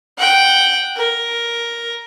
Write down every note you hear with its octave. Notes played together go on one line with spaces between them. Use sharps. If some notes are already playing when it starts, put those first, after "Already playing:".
F#5 G5
A#4